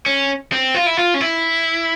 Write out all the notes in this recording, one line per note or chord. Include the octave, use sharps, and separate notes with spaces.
C#4
C4
F4
E4
F4
C#4
E4